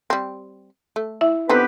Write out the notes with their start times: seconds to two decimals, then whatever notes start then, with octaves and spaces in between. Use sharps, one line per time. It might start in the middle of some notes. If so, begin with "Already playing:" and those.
0.10 G3 C4
0.96 A3
1.21 E4 E5
1.49 D3 B3 C4 D#4 G4 B4